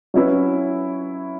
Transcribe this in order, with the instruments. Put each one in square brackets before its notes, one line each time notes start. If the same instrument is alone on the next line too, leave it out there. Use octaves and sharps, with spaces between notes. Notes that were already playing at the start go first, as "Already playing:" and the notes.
[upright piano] F#3 C#4 E4 B4